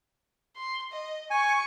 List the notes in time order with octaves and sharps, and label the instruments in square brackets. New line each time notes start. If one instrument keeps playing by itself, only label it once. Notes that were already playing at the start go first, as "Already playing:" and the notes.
[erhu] C6
D#5
[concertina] G#5 [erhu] C#6